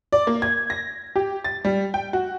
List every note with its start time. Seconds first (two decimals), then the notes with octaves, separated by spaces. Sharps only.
0.12 D5
0.27 A#3
0.42 G#6
0.70 A#6
1.16 G4
1.44 A6
1.65 G3
1.94 G5
2.13 F#4